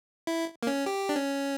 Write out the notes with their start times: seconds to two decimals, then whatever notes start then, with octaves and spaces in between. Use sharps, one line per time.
0.27 E4
0.63 A#3
0.67 C#4
0.86 G4
1.09 D4
1.16 C#4